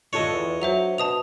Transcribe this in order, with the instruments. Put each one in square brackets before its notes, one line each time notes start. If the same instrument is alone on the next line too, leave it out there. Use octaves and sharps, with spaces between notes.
[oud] D4 F4 A4 [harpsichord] C#5 D#5
[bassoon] E2
[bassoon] F#3 [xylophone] C5 E5 F7
[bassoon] B2 [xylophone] A5 D#6 F7